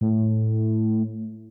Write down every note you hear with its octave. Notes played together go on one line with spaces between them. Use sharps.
A2